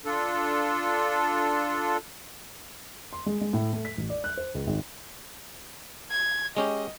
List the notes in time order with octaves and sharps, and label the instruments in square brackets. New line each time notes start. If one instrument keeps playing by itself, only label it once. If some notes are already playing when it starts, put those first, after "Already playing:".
[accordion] D4 F4 A4
[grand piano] C6
G#3
G#3
A2
A3
B6
A1
D5
F#6
C5
C#2
G#1
[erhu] G#6
[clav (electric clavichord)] G#3 C#4 G4 [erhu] D#5